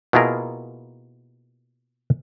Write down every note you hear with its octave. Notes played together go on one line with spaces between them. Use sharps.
B2 A#3 E4 F4 G#4 A#4